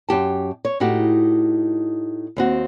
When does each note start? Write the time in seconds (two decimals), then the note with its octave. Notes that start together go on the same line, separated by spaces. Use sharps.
0.09 F#2 G4 A5
0.65 C#5
0.80 A2 D#4 F#4 G4
2.37 D#2 C4 F#4